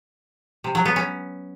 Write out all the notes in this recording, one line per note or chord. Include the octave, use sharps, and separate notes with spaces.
C3
F#3
B3
C#4